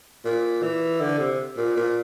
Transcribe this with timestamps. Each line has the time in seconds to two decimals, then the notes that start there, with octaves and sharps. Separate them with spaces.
0.25 A#2
0.62 E3
1.00 D3
1.19 C3
1.57 A#2
1.77 A#2